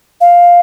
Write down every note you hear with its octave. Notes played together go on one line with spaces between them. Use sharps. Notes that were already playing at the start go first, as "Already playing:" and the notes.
F5